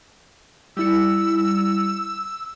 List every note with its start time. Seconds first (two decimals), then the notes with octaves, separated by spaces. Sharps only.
0.77 G3 E4 E6 C#7